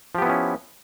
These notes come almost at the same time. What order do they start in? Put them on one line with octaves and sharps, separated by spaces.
F3 G4 B3 E4 C#4